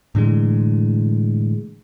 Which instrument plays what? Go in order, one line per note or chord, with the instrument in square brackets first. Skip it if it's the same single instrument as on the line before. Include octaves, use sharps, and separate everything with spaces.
[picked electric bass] A2 D3 E3 G#3